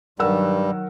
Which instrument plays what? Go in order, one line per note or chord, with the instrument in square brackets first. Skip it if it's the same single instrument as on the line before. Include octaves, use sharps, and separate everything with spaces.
[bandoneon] G2 G3 [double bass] D#3 F#3 [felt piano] A#4 F#5 E6